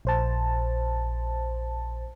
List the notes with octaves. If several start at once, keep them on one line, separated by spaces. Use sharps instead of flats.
A#1 C5 A5